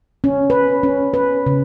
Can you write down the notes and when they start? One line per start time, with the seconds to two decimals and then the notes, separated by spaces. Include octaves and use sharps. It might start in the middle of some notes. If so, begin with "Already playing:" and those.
0.24 C#4
0.50 B4
0.83 C#4
1.14 B4
1.46 C#3